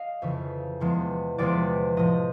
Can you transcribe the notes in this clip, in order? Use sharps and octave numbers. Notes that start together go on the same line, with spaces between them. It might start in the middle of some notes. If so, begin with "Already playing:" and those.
Already playing: D#5 F5
F2 C#3 E3 A3 E5
E2 C3 F3 G#3
E2 C3 F3 G#3 D5
A2 F3 A3 D#5